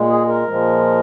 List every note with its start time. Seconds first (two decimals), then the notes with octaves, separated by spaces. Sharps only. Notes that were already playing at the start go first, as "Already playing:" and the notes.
Already playing: A#2 G#3
0.10 G#4
0.29 A#4
0.47 A#2 F3 G#3